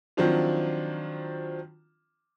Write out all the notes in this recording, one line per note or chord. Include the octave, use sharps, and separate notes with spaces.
D#3 F3 F#3 C4 D4 F4